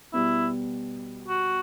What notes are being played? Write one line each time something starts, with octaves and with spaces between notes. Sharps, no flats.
B2 G3 B3 E4
F#4